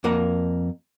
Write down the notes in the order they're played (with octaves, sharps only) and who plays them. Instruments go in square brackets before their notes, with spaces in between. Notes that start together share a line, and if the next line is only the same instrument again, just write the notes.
[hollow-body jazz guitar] F2 A#3 A#4 F#5